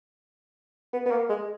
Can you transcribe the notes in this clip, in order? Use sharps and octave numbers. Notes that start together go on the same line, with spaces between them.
B3
B3
A#3
G#3